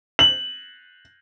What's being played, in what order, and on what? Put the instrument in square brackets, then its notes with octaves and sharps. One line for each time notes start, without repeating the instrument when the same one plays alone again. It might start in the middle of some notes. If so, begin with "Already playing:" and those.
[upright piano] F#7